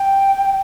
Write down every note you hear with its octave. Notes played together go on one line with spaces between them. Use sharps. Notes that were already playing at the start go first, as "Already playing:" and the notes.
Already playing: G5